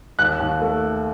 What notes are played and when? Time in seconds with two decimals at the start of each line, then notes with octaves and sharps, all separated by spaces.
0.19 D#2 F#6
0.40 D#2
0.62 A3